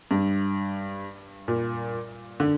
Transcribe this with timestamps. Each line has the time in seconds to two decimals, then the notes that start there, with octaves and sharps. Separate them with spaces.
0.11 G2
1.48 A#2
2.40 D3